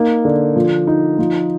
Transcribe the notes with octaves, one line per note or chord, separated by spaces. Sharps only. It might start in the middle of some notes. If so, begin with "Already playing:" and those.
Already playing: A#3 D#4
D3
F3
D#4
F3